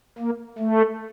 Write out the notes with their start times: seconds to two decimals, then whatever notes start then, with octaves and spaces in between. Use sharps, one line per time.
0.19 A#3
0.59 A3